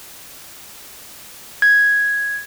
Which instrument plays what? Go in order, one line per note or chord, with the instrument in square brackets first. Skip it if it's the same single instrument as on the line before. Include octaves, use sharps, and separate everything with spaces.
[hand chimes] G#6